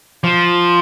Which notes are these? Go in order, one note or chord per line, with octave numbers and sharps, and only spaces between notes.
F3